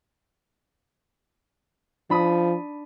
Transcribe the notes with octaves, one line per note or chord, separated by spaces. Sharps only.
F3 D4 B5 D#6